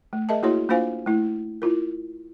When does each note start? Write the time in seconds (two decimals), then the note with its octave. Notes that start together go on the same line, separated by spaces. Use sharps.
0.13 A3
0.29 G#4 A#4 D#5 E5 A5
0.43 A#3 E4 F#4 G#4 C#5 C6
0.69 A#3 D4 F4 C5 F5 G#5
1.06 A3 E4
1.62 E4 F4 A#4